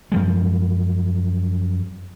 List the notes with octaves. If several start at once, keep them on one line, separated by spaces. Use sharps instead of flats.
F#2 F3 G#3